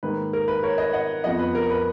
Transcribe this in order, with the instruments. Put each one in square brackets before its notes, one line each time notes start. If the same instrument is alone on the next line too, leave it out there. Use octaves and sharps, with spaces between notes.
[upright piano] G#2 D#3 A#3 B4
A#4
B4
A#4 C#5
B4 D#5
D#5 F#5
F2 F3 B3 D#5 F#5
B4
A#4
B4